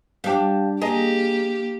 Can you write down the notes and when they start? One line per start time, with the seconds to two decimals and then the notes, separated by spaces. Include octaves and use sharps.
0.24 G3 D4 G4 F5
0.81 A#3 G4 G#4 D#5 A#5